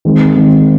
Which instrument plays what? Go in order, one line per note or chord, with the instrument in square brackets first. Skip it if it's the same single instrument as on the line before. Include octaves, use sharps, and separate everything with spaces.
[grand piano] D#3 G#3 C4
D#3 G#3 C4